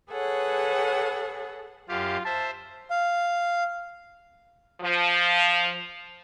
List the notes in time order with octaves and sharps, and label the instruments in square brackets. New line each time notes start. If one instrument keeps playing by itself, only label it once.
[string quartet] G#4 A4 B4 C#5 F#5
[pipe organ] F#2 G4 F5 [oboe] F4
[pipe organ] C5 E5 [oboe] A5
[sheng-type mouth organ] F5
[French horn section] F3